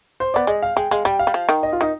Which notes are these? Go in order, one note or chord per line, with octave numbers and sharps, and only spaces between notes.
C5
B3 D5
G#3 D#5
F5
G#3 G5
G#3 F5
G3 G5
F5
G3
F3
D#3
D#5
F4
D#3 D#4